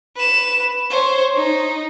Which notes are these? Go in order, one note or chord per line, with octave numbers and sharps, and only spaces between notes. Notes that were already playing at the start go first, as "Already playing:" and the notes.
B4 E7
C5 C#5
D#4